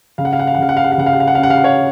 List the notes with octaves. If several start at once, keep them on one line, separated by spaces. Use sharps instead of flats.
C#3 F5
F#5
F5
F#5
F5
F#5
C#3 F5
F#5
F5
F#5
F5
C#3 F#5
F5
F#5
F5
F#5
C#4 F5
F#5
F5
F#5
C#5 F5